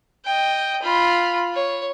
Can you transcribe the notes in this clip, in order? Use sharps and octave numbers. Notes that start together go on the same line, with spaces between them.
D#5 G5
F4 B5
C#5